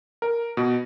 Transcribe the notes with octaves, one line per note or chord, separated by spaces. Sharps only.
A#4
B2